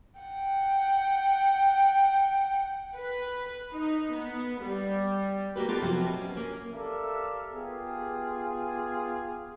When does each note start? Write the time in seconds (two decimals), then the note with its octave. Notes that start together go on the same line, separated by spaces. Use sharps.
0.20 F#5 G5
2.96 B4
3.73 D#4
4.16 B3
4.64 G3
5.56 A#3 F#4 G4 B4
5.68 B3 F4 G4 A4
5.81 C3 F3 F#3 B3 C4
6.05 B2
6.21 C#4
6.37 A#3 C#4
6.73 G4 A4 A#4 D5 E5 F5
7.53 B3 F4 G4 G#4